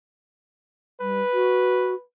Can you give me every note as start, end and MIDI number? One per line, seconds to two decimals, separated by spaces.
1.01 1.22 55
1.01 2.04 71
1.33 1.95 66